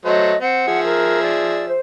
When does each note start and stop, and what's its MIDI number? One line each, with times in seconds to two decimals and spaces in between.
0.05 0.33 54
0.05 0.33 57
0.05 0.33 72
0.05 0.40 75
0.40 0.63 60
0.40 0.83 78
0.67 1.77 53
0.67 1.77 68
0.67 1.77 76
0.83 1.20 70
1.22 1.65 74
1.68 1.80 72